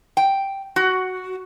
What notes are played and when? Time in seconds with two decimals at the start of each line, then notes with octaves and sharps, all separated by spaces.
0.17 G5
0.76 F#4